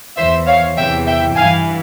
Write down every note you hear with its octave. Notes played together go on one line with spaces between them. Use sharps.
E2 E3 C5 E5
C#5 F5
E2 C3 E3 E5 G5
E5 G5
G2 E3 F5 G#5